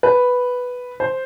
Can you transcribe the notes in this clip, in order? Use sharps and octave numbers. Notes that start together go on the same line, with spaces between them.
B4
C5